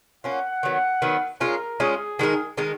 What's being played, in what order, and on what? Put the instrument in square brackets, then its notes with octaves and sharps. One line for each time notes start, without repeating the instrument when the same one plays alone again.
[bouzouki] A#3 C#4 F4 [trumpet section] F#5
[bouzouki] D#3 F#3 B3
D#3 F#3 B3
[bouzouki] G#3 C#4 F4 [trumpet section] A#4
[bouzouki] G#3 C#4 F4 [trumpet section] G#4
[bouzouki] D#3 G#3 D#4 A#4
D#3 G#3 D#4 A#4